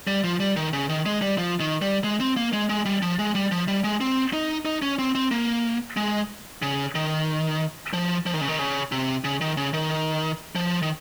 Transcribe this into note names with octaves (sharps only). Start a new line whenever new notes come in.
G3
F3
G3
D#3
C#3
D#3
G#3
G3
F3
D#3
G3
G#3
C4
A#3
G#3
G#3
G3
F3
G#3
G3
F3
G3
G#3
C4
D#4
D#4
C#4
C4
C4
A#3
G#3
C#3
D#3
F3
F3
D#3
C#3
D#3
C#3
C3
C#3
D#3
C#3
D#3
F3
D#3